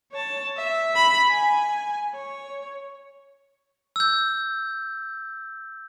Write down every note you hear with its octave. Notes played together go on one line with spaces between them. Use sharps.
C#5 A5
E5
B5
G#5
C#5
E6 G6